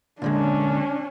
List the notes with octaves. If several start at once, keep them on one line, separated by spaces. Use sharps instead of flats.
A#2 D3 G#3 C#4 D4